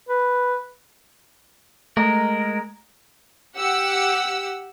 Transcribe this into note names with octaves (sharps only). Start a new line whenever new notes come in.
B4
G#3 A3 A#4
G4 F#5 E6